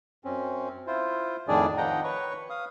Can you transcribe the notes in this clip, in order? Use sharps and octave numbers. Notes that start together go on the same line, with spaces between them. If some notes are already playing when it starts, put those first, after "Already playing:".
F#2 C4 C#4
E4 F4 C5
F2 A2 D#3 D4 G#4 D5
D#3 F3 D#5 F#5 G5 A#5
B4 C#5 C#6
F5 D#6